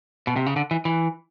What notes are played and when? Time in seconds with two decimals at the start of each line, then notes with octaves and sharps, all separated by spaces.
0.27 B2
0.36 C3
0.46 C#3
0.56 D3
0.71 E3
0.85 E3